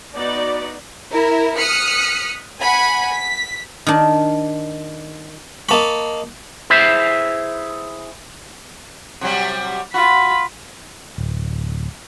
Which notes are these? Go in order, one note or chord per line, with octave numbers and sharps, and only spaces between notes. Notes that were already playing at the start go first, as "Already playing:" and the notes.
B3 D#4 F#4 D5
E4 A#4
D#6 F6 F#6 B6 C#7
F#5 G#5 B5
B6
D#3 D4
A#3 D#5 A5 B5 C#6
E4 G#4 B4 C5 E5
C3 F#3 G3
F4 F#4 B5
D1